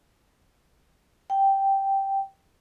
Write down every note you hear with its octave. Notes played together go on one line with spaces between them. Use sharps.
G5